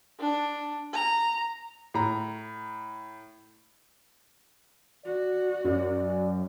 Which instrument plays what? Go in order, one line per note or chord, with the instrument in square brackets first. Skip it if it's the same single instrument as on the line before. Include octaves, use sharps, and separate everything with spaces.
[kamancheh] D4
A#5
[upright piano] A2 A#5
[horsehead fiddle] F#4 [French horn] D5
[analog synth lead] F#2 [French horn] D5